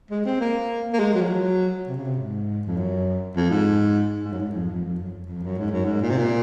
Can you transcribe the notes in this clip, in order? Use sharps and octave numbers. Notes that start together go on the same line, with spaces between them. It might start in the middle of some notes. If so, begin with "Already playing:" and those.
G#3
C4
A#3
A#3
G#3
F#3
F3
F#3
C3
C#3
C3
G#2
F2
F#2
F2
G#2
G#2
F#2
G#2
F2
F2
F2
F#2
F2
F#2
G#2
F#2
G#2
A#2
C3
A#2